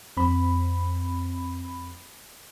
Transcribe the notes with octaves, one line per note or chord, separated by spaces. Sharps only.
F2 C4 B5